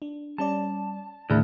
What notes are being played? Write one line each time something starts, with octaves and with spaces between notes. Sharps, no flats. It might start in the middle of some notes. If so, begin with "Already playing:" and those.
D4
G3 C#4 D5 A5
D2 A2 D#3 A3 E4 G#4 B5